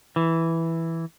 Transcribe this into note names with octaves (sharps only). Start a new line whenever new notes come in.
E3